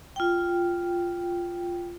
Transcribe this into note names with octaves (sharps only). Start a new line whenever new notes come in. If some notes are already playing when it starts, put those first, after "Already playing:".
F4 G5